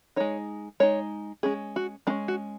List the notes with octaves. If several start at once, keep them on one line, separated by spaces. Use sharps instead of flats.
G#3 D#4 C#5
G#3 D#4 C#5
G#3 C#4 G#4
F#4
G#3 C#4 D#4
F#4